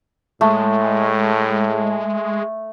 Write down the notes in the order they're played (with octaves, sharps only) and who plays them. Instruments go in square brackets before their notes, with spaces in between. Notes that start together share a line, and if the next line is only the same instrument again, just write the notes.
[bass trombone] A2 [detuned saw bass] G#3 [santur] A3